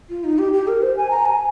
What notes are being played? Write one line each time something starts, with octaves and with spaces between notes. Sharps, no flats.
F4
D#4
G4
G4
A#4
C5
G#5
A#5
G#5